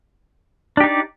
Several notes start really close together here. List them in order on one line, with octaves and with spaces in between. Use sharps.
D4 G4 D#4 D5